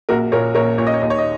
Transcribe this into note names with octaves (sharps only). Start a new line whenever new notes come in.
A#1 F#4 A#4
A#2 A#4 C#5
A#1 A#4 C#5
A#2 C#5
D#5
C#5
D#2 D#5
C#5
D#5